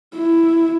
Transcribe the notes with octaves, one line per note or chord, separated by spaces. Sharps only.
E4